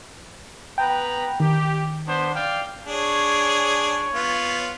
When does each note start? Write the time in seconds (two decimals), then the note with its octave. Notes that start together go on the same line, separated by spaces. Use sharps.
0.78 B3 B4 G5 A#5
1.40 D#3 G4
2.06 B3 D4 C5
2.34 D5 F5 G5
2.87 D4 G#4 C#5
4.14 B3 F4